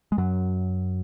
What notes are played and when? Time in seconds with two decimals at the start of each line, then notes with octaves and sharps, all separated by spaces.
0.12 G#3
0.18 F#2 F#3